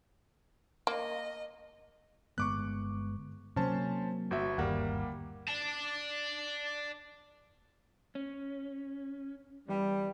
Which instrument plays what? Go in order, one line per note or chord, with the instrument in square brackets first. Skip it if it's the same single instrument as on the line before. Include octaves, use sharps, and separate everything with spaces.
[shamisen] A#3 [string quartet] D#5
[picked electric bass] G1 G#3 B3 [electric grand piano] C#6 D6 F#6
[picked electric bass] C3 F#3 A#3 [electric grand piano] C#4 C5 A5
[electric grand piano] G1 F#4 E5
[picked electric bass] G1 D#2 [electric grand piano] G3 A#3 F#5
[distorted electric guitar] D5 A5
[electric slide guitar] C#4
[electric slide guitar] E2 G2 [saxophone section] G3